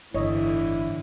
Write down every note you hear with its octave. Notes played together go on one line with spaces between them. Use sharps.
G1 A2 D3 E3 E4 C#5 D#5